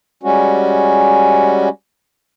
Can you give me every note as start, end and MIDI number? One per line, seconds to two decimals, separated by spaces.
0.23 1.69 55
0.23 1.69 56
0.23 1.69 61
0.23 1.69 66